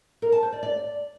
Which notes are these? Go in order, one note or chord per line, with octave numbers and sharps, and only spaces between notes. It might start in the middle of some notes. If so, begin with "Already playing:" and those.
A#4
A5
C5
D5
D5